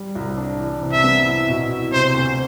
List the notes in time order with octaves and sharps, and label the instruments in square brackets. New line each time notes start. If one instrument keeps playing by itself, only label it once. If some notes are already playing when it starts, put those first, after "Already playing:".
Already playing: [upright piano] G3
C2
D4
E3
C3
[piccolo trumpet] E5
[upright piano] B3
E4
B2
E4
[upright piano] C3 [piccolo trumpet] C5
[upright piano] D2